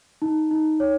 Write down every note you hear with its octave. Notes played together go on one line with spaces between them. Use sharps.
D#4
D#4
C#5